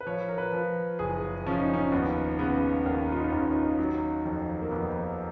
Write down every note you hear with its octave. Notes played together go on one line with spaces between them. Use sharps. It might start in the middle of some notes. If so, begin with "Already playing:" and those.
B4
F3 C#5
A#4
B4
F3
F#1 G#4
F3 C#4
D#4
C#4
D#2 B3
C#3 B3
D#2 A#4
F4
D#4
D#2
C#4
D#4
F#3
F2
A#3
F2 B3